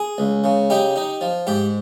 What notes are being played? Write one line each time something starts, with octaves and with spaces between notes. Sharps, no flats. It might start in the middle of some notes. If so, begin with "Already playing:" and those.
Already playing: G#4
C#2
C#3
D#4 G4
D#4
F3
G#2 G4